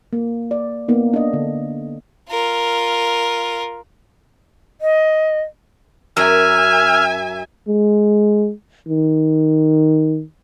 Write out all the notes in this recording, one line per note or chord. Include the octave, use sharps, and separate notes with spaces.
A#3
D5
A#3 B3 D#4
D4 D#5
D3
F4 A#4
D#5
F#2 E5 G#5 E6 F6
G#3
D#3